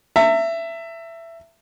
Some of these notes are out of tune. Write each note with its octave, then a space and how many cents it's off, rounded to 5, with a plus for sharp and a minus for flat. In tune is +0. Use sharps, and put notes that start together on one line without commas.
E5 +15 A#5 -45